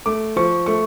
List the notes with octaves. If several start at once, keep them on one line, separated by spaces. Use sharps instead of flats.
A3 D6
F3 C#6
A3 C#6